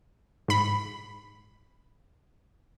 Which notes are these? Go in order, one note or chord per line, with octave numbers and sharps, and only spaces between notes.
G#2 B5